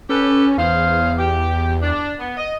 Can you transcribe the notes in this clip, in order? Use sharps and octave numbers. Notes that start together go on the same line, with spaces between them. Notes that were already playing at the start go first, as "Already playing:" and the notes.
C#4 G4 A4 B4
E2 G#4 C5 F5
G4
D4
B3
D#5